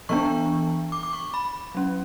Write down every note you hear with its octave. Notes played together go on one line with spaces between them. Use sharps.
E3 B3 D4 C#6
D6
D6
C#6
B5
F#3 C#4